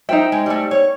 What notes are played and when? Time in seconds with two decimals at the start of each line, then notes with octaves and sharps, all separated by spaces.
0.09 D#4 C5 E5 G5
0.32 G#3
0.46 G3 A3
0.71 C#5